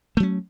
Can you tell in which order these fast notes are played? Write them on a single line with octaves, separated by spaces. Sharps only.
A3 F#3 C#4